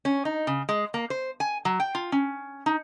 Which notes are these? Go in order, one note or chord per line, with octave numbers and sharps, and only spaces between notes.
C#4
D#4
C#3
G#3
A#3
C5
G#5
F#3
G5
F4
C#4
D#4